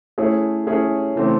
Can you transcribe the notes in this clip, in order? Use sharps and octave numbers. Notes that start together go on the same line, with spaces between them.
A3 C#4 E4 G#4 C#5
A3 C#4 E4 G#4 C#5
C#3 E3 A3 C4